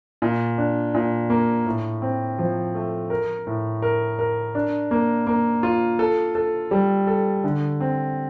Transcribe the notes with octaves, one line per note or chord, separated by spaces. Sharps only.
A#2
D4
A#2
A#3
A2
C4
F3
A3
A#4
A2
A#4
A#4
D4
A#3
A#3
F4
A4
A4
G3
A4
D3
C4